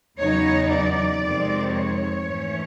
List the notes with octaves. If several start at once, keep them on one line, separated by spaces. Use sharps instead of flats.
E2 C#3 F#3 B3 D#4 C#5
D5
F2 C3 D#3 G#3 C4
C#5
G#2 E3 A3 C#4